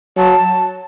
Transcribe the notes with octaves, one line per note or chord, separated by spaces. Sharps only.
F#3 A5